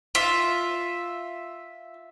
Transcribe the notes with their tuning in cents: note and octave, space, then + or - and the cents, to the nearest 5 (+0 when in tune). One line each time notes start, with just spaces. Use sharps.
F4 +0 E5 +0